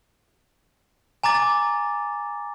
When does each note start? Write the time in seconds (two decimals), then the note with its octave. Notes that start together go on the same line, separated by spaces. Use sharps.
1.23 G#5 A#5 D6 A6